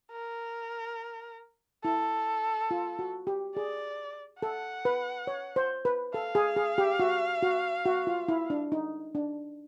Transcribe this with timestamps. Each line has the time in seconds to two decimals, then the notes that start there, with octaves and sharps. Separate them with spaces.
0.12 A#4
1.85 E4 A4
2.71 F4
2.99 F#4
3.27 G4
3.56 G#4 D5
4.42 A4 F#5
4.85 B4
5.27 C#5
5.56 C5
5.85 B4
6.14 A4 F5
6.35 G#4
6.56 G#4
6.78 G4
7.00 F#4
7.43 F#4
7.86 F#4
8.07 F4
8.28 E4
8.50 D4
8.72 D#4
9.15 D4